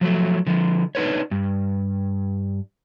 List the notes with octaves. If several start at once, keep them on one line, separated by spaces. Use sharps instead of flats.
F3 F#3 A3
D3 F3
D4 D#4 B4 C#5
G2